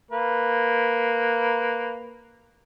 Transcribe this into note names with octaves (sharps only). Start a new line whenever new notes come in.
A#3 B4